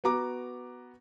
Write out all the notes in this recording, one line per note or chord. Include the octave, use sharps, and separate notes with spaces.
B3 F#4 A#5 D6